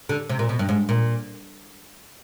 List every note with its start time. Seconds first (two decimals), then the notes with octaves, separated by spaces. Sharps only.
0.09 D3
0.29 C3
0.39 A#2
0.49 B2
0.59 G2
0.69 G#2
0.89 A#2